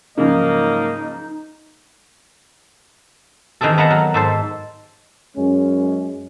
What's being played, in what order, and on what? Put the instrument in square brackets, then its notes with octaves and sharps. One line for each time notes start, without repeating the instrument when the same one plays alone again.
[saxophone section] G#2 F#3 A#3 [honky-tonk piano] C#3 F3 [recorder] D#4 [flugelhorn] D#5
[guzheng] D#3 E3 C4 G#4 A4
B3 A#4 F5 F#5 A5 A#5
F#3
G#2 A4 C5
[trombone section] F#2 G#3 C#4